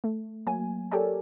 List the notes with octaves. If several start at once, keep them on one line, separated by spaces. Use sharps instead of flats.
A3
F#3 A#3 G#5
G4 A4 A#4 C#5 D5 G#5